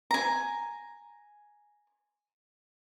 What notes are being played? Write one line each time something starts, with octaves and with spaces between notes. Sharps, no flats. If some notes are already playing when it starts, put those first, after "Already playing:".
G#5 A#5